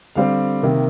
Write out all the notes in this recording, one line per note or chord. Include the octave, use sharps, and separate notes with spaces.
D3 G3 C4 F5
C3 D#3 A#3